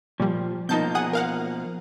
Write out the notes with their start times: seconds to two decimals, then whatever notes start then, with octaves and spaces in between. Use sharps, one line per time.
0.20 A#2 F3 G3
0.69 B2 F3 A#3 D#4 A5 G6
0.95 G#4 F#5 D#6
1.13 A#4 F5 F#5